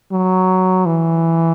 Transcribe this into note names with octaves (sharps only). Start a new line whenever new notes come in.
F#3
E3